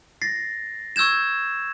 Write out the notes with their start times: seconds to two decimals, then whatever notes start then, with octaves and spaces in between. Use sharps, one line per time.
0.22 A6 A#6 C7
0.96 C#6 E6 G6 G#6 E7